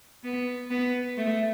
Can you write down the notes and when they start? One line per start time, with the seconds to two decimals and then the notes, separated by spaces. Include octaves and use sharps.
0.24 B3
0.70 B3
1.17 A3